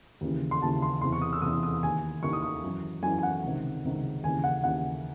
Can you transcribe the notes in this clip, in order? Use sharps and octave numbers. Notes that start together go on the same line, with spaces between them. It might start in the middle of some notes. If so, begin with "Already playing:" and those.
D#2 C#3 E3
C6
D#2 C#3 E3 A5
C6
E2 C3 E3 C6
C#6
D#6
E6
E2 C3 E3 D#6
D#6
D#2 D#3 G#5
D#2 D#3 C#6
D#6
C#6
F#2 E3
F#2 E3 G#5
G#5
F#5
C#2 C3 D#3
C#2 C3 D#3
D#2 C#3 E3 G#5
F#5
D#2 C#3 E3 F#5